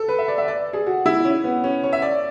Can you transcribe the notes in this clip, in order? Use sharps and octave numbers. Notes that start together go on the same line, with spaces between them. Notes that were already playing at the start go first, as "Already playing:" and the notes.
Already playing: A4
B4
E5
D5
E5
D5
G#4
F#4
E4
C#4
B3
C#4
C#5
E5
D5